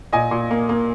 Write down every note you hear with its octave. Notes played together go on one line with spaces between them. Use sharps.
A#2 D#5 G#5
A#2
A#3
A#3